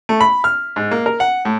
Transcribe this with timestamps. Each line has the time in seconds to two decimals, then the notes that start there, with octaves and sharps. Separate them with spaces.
0.09 A3
0.21 B5
0.44 F6
0.76 G#2
0.91 A#3
1.06 A#4
1.20 F#5
1.45 A2